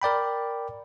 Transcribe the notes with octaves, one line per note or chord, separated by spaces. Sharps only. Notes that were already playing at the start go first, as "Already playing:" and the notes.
A#4 D5 G5 B5